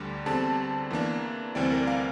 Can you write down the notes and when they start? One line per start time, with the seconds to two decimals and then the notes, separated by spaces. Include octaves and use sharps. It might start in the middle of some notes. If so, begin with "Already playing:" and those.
Already playing: D2 D3 G3
0.26 E2 D3 G3 C4 A5
0.91 E2 E3 A#3 D4
1.55 D2 C3 E3 G3 C4 D5
1.72 A#4
1.87 F5